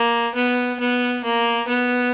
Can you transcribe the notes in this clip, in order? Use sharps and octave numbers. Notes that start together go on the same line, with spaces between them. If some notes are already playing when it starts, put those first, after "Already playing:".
Already playing: A#3
B3
B3
A#3
B3